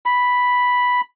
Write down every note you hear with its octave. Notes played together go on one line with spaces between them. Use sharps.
B5